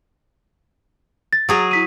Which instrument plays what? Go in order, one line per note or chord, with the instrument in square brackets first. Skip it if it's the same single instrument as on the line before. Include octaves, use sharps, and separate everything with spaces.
[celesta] A6
[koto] F#3 G#4 A#5
[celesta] E4 B6 D#7